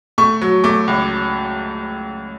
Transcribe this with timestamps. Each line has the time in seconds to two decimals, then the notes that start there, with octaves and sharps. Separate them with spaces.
0.18 A3 C#6
0.41 F#3
0.64 A3 D6
0.88 C#2